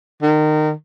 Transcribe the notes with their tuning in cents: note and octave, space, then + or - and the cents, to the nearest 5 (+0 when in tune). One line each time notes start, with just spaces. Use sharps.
D#3 -25